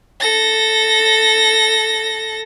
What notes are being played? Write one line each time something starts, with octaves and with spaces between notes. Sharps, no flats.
A4 A#6